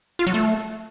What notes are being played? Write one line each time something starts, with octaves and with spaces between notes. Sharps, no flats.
F4
F#3
A3